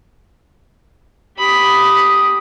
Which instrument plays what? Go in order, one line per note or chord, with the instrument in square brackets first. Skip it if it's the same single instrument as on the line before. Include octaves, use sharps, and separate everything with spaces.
[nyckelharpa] G4 D#6 [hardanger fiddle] B5